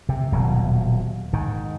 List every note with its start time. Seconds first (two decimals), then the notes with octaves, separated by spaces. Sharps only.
0.09 C3
0.32 D#1 B2 F#3
1.33 G#2 D#3